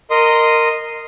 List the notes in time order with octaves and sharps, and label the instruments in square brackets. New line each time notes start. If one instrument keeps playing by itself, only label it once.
[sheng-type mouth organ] A#4 D#5 C6 D#6